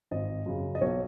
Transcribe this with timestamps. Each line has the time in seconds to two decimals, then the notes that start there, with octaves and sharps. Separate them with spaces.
0.11 G#1 D#5
0.46 F#2 C#3
0.75 D#5
0.81 B1 C#5